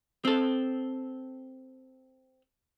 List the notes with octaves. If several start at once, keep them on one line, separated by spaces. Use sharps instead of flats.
C4 A4